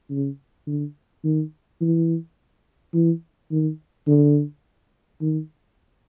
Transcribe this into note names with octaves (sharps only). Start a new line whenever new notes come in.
C#3
D3
D#3
E3
E3
D#3
D3
D#3